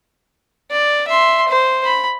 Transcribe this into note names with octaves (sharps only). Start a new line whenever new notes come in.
D5
E5 C6
C5
B5